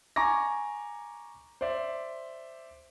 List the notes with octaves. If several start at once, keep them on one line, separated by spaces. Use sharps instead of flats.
G#5 A#5 C#6 D6 A#6
C5 D5 E5